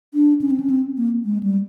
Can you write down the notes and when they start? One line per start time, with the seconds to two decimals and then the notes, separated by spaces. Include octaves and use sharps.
0.14 D4
0.41 C#4
0.50 C4
0.60 C#4
0.70 C4
0.97 A#3
1.25 G#3
1.43 G3